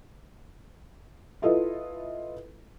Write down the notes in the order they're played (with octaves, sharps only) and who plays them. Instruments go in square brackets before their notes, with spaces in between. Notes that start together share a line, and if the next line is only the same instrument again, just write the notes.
[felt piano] E4 F4 A4 B4 D#5